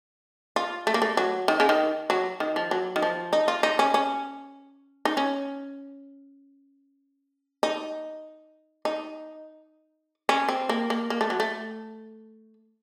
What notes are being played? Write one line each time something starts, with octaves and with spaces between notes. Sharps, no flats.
F4
A3
A#3
A3
F#3
D#3
C#3
D#3
F#3
D#3
F3
F#3
D#3
F3
D#4
F4
D#4
C#4
C#4
D#4
C#4
D#4
D#4
C#4
C4
A#3
A#3
A#3
A3
F#3
A3